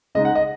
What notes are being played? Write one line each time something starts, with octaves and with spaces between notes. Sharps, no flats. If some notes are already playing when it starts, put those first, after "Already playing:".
C#3 G#3 D#4 D#5
F#5
D#5